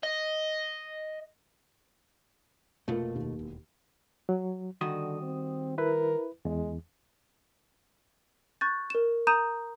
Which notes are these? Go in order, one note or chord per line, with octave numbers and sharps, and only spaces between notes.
D#5
F1 B2 A3 A#3 F4
D#2
E1
F#3
D3 D#3 G3 F#4 D#6
C4
E4 A#4 B4
E2 G#3
C#6 F#6 G6 A6
A#4 E7
A#5 D#6 G6 D#7 E7